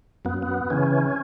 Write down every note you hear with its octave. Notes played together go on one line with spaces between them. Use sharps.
F#2 B3
B3
C#3 E3 C#4